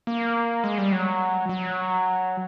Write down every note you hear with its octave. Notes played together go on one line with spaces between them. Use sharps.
A#3
G#3
G3
F#3
F#3